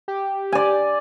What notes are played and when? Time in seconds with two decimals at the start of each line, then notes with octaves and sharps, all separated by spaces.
0.08 G4
0.52 D5 G#5